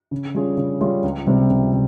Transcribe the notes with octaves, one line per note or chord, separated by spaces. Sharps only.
C#3
G3 C#4 F4 G#4
C#3
G3 C#4 F4 G#4
C#2
C3 G3 C4
C#2
C3